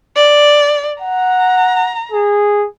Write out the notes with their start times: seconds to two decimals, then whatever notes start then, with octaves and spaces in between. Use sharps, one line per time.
0.16 D5
1.02 F#5 A#5
2.12 G#4